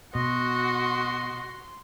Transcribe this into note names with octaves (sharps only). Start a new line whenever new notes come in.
B2 F#4 D#5 C6